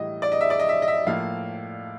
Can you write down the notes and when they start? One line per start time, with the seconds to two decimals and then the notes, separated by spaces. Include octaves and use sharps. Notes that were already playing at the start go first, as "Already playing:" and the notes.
Already playing: A2 E3 G3 D#5
0.22 D5
0.32 D#5
0.41 E5
0.50 D5
0.60 D#5
0.69 E5
0.82 D#5
0.88 E5
1.07 A2 F3 A#3 F5